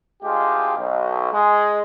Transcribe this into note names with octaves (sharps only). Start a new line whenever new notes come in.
D2 G#3 F4 G4
B1
G#3